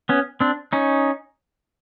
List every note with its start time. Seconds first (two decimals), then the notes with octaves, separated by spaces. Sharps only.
0.09 B3 C#4
0.40 C4 D4
0.73 C#4 D#4